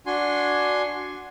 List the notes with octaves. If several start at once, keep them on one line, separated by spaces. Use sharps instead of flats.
D4 F#4 G#5 C6